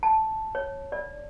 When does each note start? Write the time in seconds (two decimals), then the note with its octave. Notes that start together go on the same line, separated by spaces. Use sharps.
0.03 A5
0.55 C#5
0.92 D5